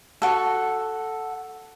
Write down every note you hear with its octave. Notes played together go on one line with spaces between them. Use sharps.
F#4 A4